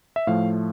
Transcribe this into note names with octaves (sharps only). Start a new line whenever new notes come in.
E5
A2 F3 A3 F5